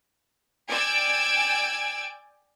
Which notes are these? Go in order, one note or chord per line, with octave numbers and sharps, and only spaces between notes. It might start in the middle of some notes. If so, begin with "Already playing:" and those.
D5 G5 G#5 E6 G#6 D7